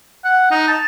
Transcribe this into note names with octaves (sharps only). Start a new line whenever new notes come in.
F#5
D#4
A5